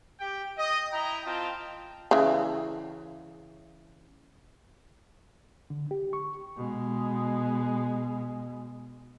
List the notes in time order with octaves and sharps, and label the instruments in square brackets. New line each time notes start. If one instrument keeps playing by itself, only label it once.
[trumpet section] G4 G5
D#5
E4 D#5 G5 A#5
C4 F4 D#5 G5 A5
[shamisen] C#3 E3
[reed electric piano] D3
G4
C#6
[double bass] B2 G#3